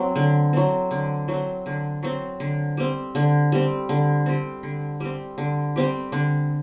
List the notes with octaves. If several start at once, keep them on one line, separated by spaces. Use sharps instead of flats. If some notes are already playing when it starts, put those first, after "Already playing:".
Already playing: F#3 C4
D3
F#3 C4
D3
F#3 C4
D3
F#3 C4
D3
G3 C4
D3
G3 C4
D3
G3 C4
D3
G3 C4
D3
G3 C4 G4
D3